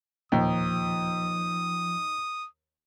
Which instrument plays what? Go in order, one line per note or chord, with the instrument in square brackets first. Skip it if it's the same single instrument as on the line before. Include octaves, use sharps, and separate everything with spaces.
[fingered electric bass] E1 A#2 [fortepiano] D#2 [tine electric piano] F3 [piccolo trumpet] D#6